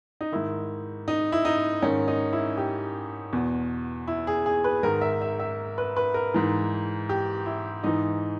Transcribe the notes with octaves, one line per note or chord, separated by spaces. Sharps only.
D#4
G#2 D#3 E4
D#4
E4
D#4
G#2 D#3 C#4
D#4
E4
G4
E2 B2
E4
G#4
G#4
B4
G#2 D#3 A#4
E5
E5
E5
B4
B4
A#4
G#2 E3
G4
E4
G#2 E3 D#4